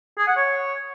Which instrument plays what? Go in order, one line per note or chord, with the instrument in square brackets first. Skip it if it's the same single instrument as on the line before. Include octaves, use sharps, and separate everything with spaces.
[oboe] G#4
F#5
C#5